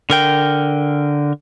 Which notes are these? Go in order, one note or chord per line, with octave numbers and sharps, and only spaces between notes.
D3 A#4 G5